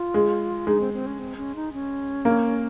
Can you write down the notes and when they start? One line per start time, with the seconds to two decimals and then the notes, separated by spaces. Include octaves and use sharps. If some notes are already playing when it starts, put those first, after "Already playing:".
Already playing: F4
0.14 G#3
0.67 G#3 D#4
0.80 C4
0.94 C4
1.06 C#4
1.19 C4
1.37 C#4
1.55 D#4
1.73 C#4
2.25 A#3